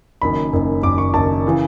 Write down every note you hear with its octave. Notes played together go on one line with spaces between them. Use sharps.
F#1 F#2 D#3 B5
F#1 F#2 D#3
F#1 F#2 D#3 D6
C#6
F#1 F#2 D#3 A5
C#3 E3